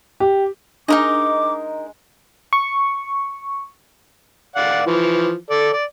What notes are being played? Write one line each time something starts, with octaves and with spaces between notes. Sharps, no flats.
G4
G#3 D4 D#4 A#4 D#5 D6
C#6
D5 F5 F#5
E3 F3
A4 D5
D5